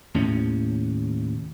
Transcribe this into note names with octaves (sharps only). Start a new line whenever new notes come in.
D#2 A2 C3 C#4